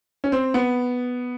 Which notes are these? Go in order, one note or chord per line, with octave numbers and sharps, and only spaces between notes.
C#4
C4
B3